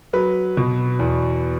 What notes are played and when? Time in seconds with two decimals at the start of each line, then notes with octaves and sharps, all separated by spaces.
0.13 F#3 B4
0.57 B2
0.99 E2